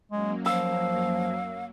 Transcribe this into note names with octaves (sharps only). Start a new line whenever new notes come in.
F#2 F#3 G#3 A#3
F3 F5 E6